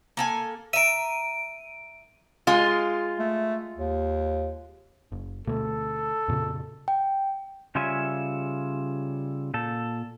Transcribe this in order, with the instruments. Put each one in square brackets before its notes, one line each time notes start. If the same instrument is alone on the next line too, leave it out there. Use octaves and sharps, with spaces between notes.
[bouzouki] A#3 A4 G#5
[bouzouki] E5 A#5 [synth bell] D7 D#7
[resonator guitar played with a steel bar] G#3 F4
[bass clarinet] A3
D#2
[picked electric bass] F#1
[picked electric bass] D2 B2 A3 [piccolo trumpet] A4
[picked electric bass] F2 A#2 C#3
[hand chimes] G5
[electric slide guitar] C#3 G3 F4 C#5 E5 G#5
A#2 A4